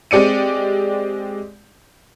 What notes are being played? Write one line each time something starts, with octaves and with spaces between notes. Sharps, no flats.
G#3 C4 G4 D5 C#7 D#7